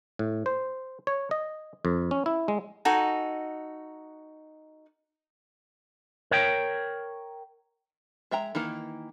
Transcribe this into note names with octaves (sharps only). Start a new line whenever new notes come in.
A2
C5
C#5
D#5
F2
C#4
E4
G#3
D#4 F#4 A4 G#5
A#4 C#5 G5
G#3 E5 G5 A#5
D#3 E3 A#3